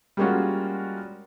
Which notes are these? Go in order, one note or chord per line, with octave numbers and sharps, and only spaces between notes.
G3 G#3 A#3 C#4 F4 F#4